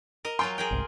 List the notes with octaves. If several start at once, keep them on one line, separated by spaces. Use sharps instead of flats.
A#4 D#5
F#3 F4 G5 G#5 C6
G#4 A#4 G5
G1 C2 G#2